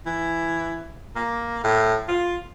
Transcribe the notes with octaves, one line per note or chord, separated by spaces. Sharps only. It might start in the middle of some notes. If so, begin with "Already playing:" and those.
E3
A#3
A2
F4